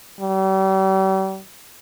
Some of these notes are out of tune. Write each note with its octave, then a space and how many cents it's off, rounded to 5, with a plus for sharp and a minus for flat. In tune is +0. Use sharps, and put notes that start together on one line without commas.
G3 -40